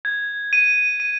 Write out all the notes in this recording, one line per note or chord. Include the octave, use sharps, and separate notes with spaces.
G#6
D#7
D#7